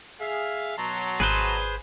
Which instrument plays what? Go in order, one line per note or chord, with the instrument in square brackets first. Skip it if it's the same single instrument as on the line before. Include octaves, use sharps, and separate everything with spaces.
[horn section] G#4 F5 [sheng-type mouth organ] E5
[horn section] B2 F#3 [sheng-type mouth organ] A5 A#5 C6
[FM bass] G#1 [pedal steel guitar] G#4 B4 C5